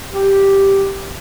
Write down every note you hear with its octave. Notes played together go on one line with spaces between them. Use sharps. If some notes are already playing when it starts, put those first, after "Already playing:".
G4